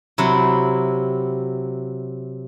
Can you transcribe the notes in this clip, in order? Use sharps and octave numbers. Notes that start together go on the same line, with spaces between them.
C3 F#3 E4